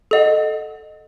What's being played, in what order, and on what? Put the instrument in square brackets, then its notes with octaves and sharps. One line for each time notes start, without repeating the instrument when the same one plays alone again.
[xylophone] A4 D#5 F#5